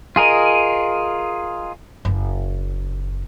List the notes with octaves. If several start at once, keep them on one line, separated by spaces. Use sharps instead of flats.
F4 G#4 A#4 D#5
F#1